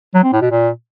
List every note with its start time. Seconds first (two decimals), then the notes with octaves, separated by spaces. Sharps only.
0.14 F#3
0.23 C4
0.32 A2
0.42 B2
0.51 A#2